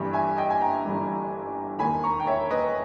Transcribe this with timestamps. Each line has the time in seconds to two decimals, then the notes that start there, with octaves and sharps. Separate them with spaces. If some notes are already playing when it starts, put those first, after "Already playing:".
Already playing: G1 G2 E3 G3
0.13 E5 G#5
0.37 D#5 G5
0.50 G#5
0.61 G5 A#5
0.85 G1 G2 E3 G3
1.79 E1 D#2 D#3 G#5 B5
2.03 A#5 C#6
2.19 G5
2.26 C#5 E5
2.50 B4 D#5